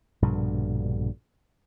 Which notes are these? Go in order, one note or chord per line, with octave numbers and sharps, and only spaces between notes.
A#1 G2 B2 D3